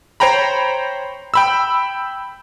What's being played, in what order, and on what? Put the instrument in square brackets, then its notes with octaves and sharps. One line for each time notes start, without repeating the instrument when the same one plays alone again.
[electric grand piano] C5 C#5 G5 A#5 B5
G5 B5 E6